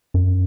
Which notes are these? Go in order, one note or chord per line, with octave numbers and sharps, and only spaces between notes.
F#2